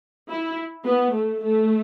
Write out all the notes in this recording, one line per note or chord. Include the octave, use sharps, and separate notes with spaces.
E4
B3
A3
A3